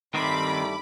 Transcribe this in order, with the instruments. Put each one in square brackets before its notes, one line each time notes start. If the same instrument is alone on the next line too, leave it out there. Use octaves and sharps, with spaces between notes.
[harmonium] G2 G3 A3 [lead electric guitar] D#3 C4 [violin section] B5 D6